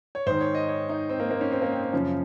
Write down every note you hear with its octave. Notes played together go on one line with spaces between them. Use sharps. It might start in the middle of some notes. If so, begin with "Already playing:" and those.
C#5
G#2 D#3 C5
C#5
D#5
C#5
D#4
C4
A#3
A#3
C#4
C4
A#3
C4
C4
F#2 C#3 F3 C#4